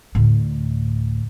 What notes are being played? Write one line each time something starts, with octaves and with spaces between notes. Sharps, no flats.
D2 A2